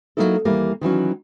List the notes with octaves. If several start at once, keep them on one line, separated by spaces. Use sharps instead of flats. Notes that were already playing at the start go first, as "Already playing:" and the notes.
F#3 A3 A#3 D#4 E4 A4
D#2 E3 G3 A#3
D#3 E3 F#3 C#4